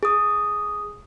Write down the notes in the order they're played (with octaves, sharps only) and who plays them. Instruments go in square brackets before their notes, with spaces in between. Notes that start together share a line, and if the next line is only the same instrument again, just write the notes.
[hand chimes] G#4 D#6